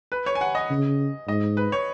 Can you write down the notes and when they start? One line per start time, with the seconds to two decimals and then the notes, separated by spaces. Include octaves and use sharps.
0.12 B4
0.26 C#5
0.35 G#5
0.41 F#5
0.55 D#5
0.70 C#3
1.28 G#2 D#5
1.57 B4
1.72 C#5